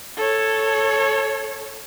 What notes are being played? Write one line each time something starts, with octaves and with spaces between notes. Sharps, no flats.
A4 C#5